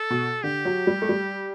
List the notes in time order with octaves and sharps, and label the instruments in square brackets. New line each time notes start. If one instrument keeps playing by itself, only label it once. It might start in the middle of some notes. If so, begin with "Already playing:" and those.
Already playing: [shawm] A4
[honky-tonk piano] B2
[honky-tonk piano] D3 [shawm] G4
[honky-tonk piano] F#3
G3
A3
G3